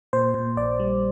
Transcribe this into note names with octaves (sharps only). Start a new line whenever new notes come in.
A#2 C5
A#2
A#1 D5
G3